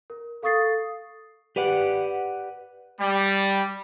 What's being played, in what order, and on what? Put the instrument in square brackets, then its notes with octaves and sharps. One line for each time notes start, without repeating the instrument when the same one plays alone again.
[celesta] A#4
A4 F5 C#6 D#6 A6 C7
[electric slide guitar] G4 B4 D5 F#5
[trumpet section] G3